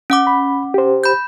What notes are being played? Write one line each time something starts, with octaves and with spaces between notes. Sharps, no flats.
C#4 F#5 D6
B5
G4 C5
B5 G6